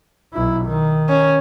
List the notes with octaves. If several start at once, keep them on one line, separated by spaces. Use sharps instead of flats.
B1 E4
D#3
C#4